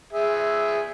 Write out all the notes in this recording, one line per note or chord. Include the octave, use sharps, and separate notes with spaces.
G#4 E5